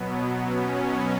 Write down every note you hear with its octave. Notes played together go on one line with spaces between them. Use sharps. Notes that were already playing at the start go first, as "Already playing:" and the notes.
Already playing: B2 F#3 B3
C#4